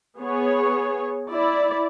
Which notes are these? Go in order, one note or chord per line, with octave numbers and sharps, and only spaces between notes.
B3 G#4 C#5
E4 D5